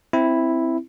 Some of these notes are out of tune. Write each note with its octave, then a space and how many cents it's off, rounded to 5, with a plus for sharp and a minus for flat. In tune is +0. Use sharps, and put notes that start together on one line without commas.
C4 +0 E4 +0